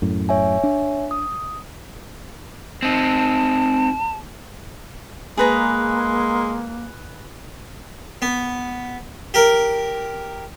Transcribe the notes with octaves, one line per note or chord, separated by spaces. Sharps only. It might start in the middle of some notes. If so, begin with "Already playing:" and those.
F#2 A2
C#5 E5 G#5
D4
D#6
C4 D#4 A5
G#3 A#3 G#4 B4 A#5
B3
G4 A#4